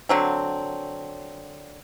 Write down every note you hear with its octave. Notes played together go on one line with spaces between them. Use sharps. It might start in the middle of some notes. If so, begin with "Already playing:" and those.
D3 F#3 C4